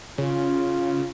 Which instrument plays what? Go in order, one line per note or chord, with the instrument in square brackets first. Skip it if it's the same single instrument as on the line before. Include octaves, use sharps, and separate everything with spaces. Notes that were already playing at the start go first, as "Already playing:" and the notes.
[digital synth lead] C#3 [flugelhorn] F4